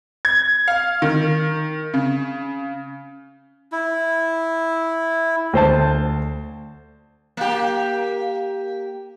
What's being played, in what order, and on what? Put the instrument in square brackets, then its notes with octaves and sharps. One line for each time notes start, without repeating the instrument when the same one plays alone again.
[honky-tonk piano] G#6
F5
D#3
C#3
[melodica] E4
[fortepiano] D2 C5 A5
[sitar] A#3 G4